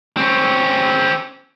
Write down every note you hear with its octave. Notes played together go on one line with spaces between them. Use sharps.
C4 C#4